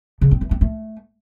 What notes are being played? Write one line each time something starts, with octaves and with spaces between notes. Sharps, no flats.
C#3
C4
E3
C4
A3